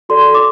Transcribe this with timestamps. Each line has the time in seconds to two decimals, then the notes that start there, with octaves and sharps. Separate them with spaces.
0.09 F#4 A4 D5 C6
0.35 D6